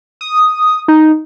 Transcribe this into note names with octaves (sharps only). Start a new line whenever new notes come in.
D#6
D#4